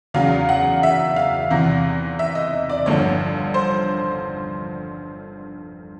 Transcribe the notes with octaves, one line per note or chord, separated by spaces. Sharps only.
E2 C#3 F#3 F5
F#5
E5
F5
E2 C3 E3
E5
D#5
D5
G1 G2 D3 F3 C#5
C5